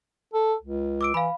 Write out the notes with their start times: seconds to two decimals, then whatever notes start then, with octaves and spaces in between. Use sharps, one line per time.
0.34 A4
0.63 C#2
1.01 D6 E6 D7
1.14 E3 F5 B5